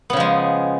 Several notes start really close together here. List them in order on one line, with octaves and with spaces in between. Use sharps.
B3 C#3 F3 G#3